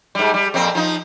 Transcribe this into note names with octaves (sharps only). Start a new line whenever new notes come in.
G#2 G3
G3
F2 A#2 C4
F3 D#4